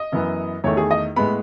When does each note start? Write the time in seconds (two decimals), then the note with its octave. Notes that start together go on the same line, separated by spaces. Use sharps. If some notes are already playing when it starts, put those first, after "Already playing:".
Already playing: D#5
0.12 F#2 E3 B3
0.64 E2 D#3 A3 C#5
0.77 G#4
0.91 D#5
1.16 A2 G#3 B3 B5